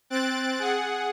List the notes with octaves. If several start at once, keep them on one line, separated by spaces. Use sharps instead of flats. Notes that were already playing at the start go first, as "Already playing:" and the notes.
C4 F#6 A6 D7
G#4 F#5